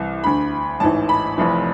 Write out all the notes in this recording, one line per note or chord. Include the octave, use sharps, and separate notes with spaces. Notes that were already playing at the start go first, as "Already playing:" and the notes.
Already playing: C2 E3
D2 D3 B5
A1 G#2 E3 A5
B5
F1 F2 E3